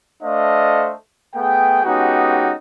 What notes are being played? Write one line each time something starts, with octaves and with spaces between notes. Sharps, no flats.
A3 D4 A4 C5 D#5 F5
A3 B3 G#4 G5
G#3 B3 C#4 D#4 F#4 G4